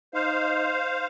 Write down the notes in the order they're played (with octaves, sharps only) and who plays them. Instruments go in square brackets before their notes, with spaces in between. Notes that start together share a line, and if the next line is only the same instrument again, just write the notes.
[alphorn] D#4 [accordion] C5 F5